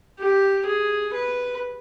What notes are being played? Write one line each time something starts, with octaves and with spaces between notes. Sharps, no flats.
G4
G#4
B4